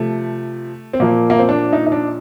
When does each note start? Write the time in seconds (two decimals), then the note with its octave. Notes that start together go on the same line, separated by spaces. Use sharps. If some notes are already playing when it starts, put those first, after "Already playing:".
Already playing: C3 F3 A3
0.93 C4
1.00 A#2 F3 A#3
1.30 A#3
1.39 C4
1.49 D4
1.73 D#4
1.86 D#4
1.92 D4